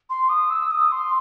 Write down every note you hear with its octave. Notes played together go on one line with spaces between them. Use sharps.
C6
D#6
E6
D#6
C6